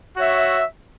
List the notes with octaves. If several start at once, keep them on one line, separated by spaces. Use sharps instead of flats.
F#4 C#5 E5